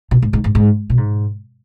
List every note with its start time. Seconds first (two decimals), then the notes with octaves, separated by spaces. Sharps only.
0.11 B2
0.22 G#2
0.33 G#2
0.44 G#2
0.55 G#2
0.90 B2
0.97 G#2